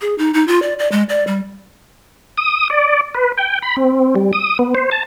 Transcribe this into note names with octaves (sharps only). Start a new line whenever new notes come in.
G#4
D#4
D#4
F4
D5
D5
G#3
D5
G3
D#6
D5
B4
G5
B5
C4
G3
D#6
B3
C5
A5